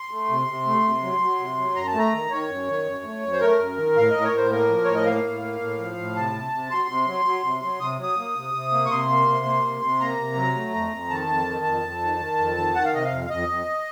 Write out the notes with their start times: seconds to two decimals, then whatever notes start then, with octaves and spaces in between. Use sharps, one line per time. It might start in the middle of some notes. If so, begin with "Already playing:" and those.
Already playing: C6
0.11 A3
0.29 C3
0.48 C3
0.66 A3
0.84 C3
1.02 F#3
1.21 F#3
1.40 C3
1.57 F#3
1.75 F#2 A#5
1.87 A5
1.94 A3
1.99 A#5
2.12 D#3
2.31 D#3 C#5
2.49 F#2
2.67 D#3
2.86 F#2
3.04 A3
3.22 F#2
3.33 C5
3.41 A3 A#4
3.59 F#2
3.77 D#3
3.96 A2 F5
4.10 A2 D#5
4.24 C#5
4.32 A2
4.37 C5
4.51 A#3 A#4
4.69 F3
4.85 A2 C#5
4.95 D#5
5.06 A#3 F5
5.24 A2
5.42 A#3
5.61 A2
5.79 F3
5.97 A2
6.16 C3 A5
6.34 C3
6.52 C3
6.70 F#3 C6
6.89 C3
7.06 F#3
7.25 F#3
7.43 C3
7.62 F#3
7.80 C3 D#6
7.98 F#3 D#6
8.17 A#3
8.35 C3
8.54 C3
8.72 A#3
8.86 C#6
8.90 C3 C6
9.09 A#3
9.28 C3
9.45 A#3
9.63 C3
9.82 C3
10.00 A#3 A#5
10.19 C3
10.37 F#3
10.55 A3
10.74 F2
10.92 F2
11.10 D#3 A5
11.28 F2
11.47 D#3
11.65 F2
11.84 F2
12.02 D#3
12.20 D#3
12.38 F2
12.57 D#3
12.75 D#3 F#5
12.85 F5
12.94 C3 D#5
13.05 F5
13.12 F2
13.25 F5
13.30 F2 D#5
13.49 F2